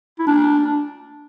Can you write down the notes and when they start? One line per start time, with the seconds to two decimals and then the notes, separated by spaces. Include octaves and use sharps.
0.19 E4
0.27 D4